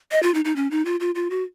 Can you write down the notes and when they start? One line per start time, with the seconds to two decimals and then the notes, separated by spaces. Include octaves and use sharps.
0.11 D#5
0.23 F4
0.34 D#4
0.45 D#4
0.56 C#4
0.71 D#4
0.85 F4
1.00 F4
1.15 F4
1.30 F#4